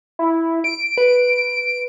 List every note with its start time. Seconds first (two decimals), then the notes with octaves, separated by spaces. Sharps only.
0.19 E4
0.64 D7
0.98 B4